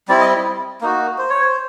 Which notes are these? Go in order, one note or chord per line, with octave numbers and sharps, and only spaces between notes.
G3 C4 E4 D5
D#5
A#3 D#4 F#4
C5
C#5
C5